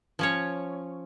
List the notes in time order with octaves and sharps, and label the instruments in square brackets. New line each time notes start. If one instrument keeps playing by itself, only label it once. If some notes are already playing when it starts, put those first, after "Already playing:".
[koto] F3 C#4 C#5